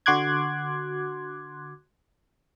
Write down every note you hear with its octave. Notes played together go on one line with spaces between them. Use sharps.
D3 F#4 C6 D6 F#6 G#6